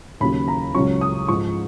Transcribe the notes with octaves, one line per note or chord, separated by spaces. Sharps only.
D#2 C#3 F#3 B5
A#5
C#2 C#3 F#3 C#4 C#6
D#6
G#2 F3 G#3 D#4 C#6